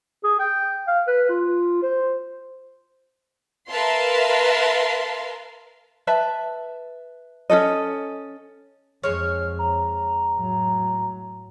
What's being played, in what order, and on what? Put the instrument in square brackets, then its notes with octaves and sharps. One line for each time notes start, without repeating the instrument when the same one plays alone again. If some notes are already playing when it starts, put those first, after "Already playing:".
[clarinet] G#4
G5
F5
B4
F4
C5
[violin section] A#4 B4 E5 F5 A5 C6
[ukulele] B4 E5 A5
C#4 F#4 A4 D#5
[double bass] F2 [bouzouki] G#3 C#5 [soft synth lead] F6
[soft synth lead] A#5
[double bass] A2 F#3